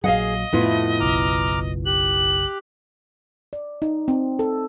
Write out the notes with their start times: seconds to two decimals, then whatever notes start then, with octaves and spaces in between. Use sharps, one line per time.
0.04 A#1 F#3 G#4 D#5 F5 F#5
0.53 F2 A2 A3 B3 E4 F4
1.00 F#1 B1 A#5 D6 F6
1.86 G4 F#6 F#7
3.53 D5
3.82 D#4
4.08 C4
4.39 A4